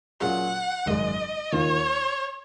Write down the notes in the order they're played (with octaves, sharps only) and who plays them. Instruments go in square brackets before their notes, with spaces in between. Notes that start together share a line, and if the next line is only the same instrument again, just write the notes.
[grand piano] A#2 F#3 C#4 F4 G#4 [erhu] F#5
[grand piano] G#1 F#2 C#3 G#3 [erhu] D#5
[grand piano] D#2 D#3 A#3 F4 [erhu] C#5